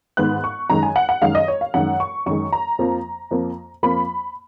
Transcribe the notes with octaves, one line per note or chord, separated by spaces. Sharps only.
G#2 D#3 G#3 B3 F#6
C#6
F#2 D#3 G#3 A#5
G#5
F#5
F#5
F#2 D#3 G#3 F5
D#5
C#5
F5
F#2 D#3 G#3 F#5
C#6
F#2 D#3 G#3 C#6
A#5
F2 F3 A#3
F2 F3 A#3
F2 F3 A#3 B5